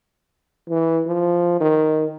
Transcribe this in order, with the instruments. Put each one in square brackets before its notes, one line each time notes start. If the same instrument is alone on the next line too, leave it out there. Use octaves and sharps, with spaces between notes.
[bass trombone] E3
F3
D#3